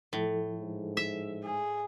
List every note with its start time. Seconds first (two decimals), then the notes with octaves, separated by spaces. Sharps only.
0.13 A2 F3 E4 A4
0.60 G#2
0.97 E5
1.43 G#4